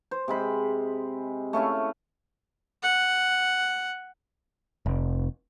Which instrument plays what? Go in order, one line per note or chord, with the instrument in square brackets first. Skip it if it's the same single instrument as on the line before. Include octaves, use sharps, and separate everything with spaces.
[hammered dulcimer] C5
C3 G#3 B5
A3 C#4 E4 F5
[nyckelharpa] F#5
[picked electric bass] F1